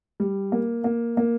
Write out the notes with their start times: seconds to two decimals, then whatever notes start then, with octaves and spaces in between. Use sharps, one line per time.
0.20 G3
0.52 A#3
0.84 A#3
1.17 A#3